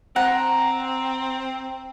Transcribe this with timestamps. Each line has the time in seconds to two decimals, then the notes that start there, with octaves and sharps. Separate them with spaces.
0.16 C4 F#5 A#5